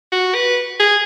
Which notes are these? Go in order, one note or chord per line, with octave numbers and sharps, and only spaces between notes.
F#4
B4
G#4